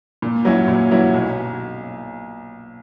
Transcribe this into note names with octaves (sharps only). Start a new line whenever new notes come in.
A#2
F#3 C#4 E4
A#2
F#3 C#4 E4
B1